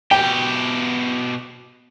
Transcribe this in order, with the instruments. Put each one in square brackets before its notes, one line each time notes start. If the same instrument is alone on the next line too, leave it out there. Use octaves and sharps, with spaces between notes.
[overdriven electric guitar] B2 G4 [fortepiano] G5